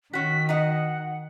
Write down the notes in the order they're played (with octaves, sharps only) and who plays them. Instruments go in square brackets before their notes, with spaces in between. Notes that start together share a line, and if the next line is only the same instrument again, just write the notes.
[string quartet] D#3 [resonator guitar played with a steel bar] C#4 F#4 [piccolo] B6
[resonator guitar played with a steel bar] D#4 F#4 D#5 [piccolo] F#5